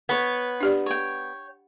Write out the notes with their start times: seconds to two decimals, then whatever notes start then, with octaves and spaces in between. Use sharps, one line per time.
0.09 B3 B4 C#5
0.61 D4 G4 D5
0.86 C#5 G5